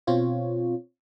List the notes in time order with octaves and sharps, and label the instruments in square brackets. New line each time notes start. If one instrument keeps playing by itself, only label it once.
[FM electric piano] B2 C4 F4 C#5